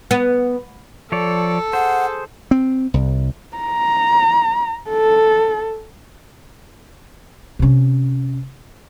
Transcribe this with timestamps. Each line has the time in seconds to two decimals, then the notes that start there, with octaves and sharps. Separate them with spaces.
0.11 B3
1.12 F3 A4 C#5 D5
1.73 G#4 C5 F#5
2.51 C4
2.94 C2
3.57 A#5
4.90 A4
7.59 C3 C#4